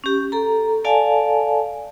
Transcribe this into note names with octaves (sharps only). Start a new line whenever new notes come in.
C#4 G4
A4 A#5
A4 D5 F5 G#5 A5